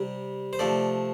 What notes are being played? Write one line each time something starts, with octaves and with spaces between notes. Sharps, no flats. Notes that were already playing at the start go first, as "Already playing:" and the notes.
Already playing: C3 G3
C5
C3 F3 A3 D5